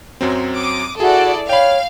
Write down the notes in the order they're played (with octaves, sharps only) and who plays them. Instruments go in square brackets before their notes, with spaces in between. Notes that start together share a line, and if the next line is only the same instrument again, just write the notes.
[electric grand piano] F#2 F#3 C4
[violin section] D6 D#6
[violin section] E4 A4 D5 [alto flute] F#4 [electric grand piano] G#4
[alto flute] C#5 [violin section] F5 [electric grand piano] G5 B5